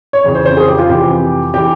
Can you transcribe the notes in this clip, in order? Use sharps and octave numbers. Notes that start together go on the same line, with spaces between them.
C#5
F2 C#3 E3 C#5
C5
C5
G#4
G4
F4
F2 C3 E3 G4
E3 G4